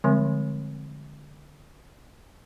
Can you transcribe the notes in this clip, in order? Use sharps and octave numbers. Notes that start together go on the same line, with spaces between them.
D3 F3 G3 G#3 C4